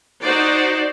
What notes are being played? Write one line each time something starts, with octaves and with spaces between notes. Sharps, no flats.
D#4 F#4 C5 D5